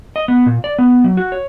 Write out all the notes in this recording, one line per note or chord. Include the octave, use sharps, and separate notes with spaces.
D#5
B3
A#2
D5
B3
F#3
F#4
C#5